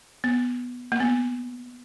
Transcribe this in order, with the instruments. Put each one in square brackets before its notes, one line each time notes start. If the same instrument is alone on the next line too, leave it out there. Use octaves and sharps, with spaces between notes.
[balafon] B3
A#3
B3